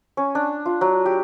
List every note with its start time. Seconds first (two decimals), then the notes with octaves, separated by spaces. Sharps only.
0.17 C#4
0.35 D4
0.66 F4
0.81 F#3
1.06 G4